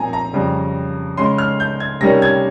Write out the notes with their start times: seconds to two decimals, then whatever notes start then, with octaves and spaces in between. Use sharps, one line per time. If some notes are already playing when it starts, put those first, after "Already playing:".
Already playing: A#2 F3 C4 G#5 A#5
0.13 A#5
0.33 F2 C#3 G3
1.17 C#3 G#3 C#4 C6
1.38 F6
1.60 G6
1.80 G#6
2.01 C3 D#3 G3 A#3 C#4 A#6
2.22 G#6